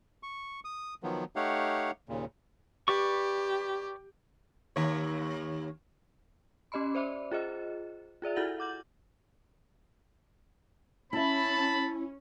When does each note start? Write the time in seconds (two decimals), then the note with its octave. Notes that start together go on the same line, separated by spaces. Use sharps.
0.23 C#6
0.65 D#6
1.03 D#3 F3 F#3 B3
1.36 A3 D#4 G4 C#5 F5 F#5
2.09 D#2 A#2 C#3
2.88 G4 B4 D5 C#6
4.76 D#2 C#5
6.72 C#4 G4 D#5 B5 C6
6.95 C5 D5 E5 B5
7.31 F4 G#4 C5 D#5
8.22 F4 G#4 D5 E5
8.36 E4 F#4 A4 F#5 A6 F#7
8.58 F#5 D6 G6 F#7
11.13 C#4 E4 E5 A5 B5